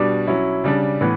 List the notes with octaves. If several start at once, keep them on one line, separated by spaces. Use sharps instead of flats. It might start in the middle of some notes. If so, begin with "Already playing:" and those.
Already playing: B2 G3 D4
F#3 C#4 E4
C#3 G3 D4
A2 E3 B3